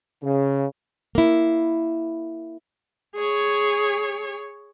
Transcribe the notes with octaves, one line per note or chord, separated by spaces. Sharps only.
C#3
A#3 E4
G#4 C#5